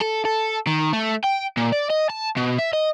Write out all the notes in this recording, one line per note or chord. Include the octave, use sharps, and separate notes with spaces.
A4
A4
D#3
A3
G5
A#2
D5
D#5
A5
B2
E5
D#5